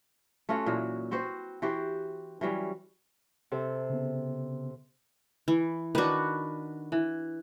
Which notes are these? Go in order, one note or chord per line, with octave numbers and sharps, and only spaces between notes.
A3 C#4 F4 F#4
A#2 E3 F#3
C4 F#4 B4 C5
E3 F#4 G4 C5
E3 F#3 G3 C#4
C3 A4
C#3 B3
E3
D#3 D4 F#4 B4
E3